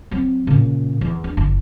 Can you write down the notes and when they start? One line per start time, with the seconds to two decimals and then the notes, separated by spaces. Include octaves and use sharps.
0.11 F#3 C4
0.47 A#2 C#3
1.01 E2
1.24 D4
1.37 F#1